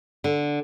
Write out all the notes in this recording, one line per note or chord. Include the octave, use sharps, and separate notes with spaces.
D3